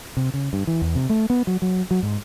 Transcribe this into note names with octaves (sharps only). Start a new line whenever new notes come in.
C3
C#3
G2
E3
E2
C3
A3
B3
F#3
F#3
F#3
G#2